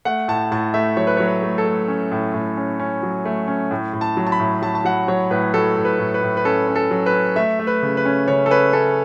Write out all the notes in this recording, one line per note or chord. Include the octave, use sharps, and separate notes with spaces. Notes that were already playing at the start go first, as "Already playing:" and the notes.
A3 F#5
A2 A5
A2 A5
A3 E5
F#3 C#5
B4
C#5
F#3
B4
A3
A4
A3
C#4
A2
A2
C#4
C#4
F#3
A3
C#4
A2
A2
A5
F#3
A5
B5
A2
F#3 A5
A5
F#3 F#5
F#3 C#5
A2 B4
F#3 A4
A2
B4
A2
B4
A2
B4
C#4 A4
C#4
A4
F#3
B4
C#4
A3 E5
A3
B4
C#3
B4
C#4
C#3 C#5
A4
C#4 B4
C#4 A4